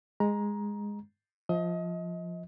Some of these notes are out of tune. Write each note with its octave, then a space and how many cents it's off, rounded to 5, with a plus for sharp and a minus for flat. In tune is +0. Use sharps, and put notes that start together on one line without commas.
G#3 -10 A#5 +15
F3 +0 D#5 +30